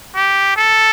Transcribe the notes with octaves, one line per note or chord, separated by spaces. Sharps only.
G4
A4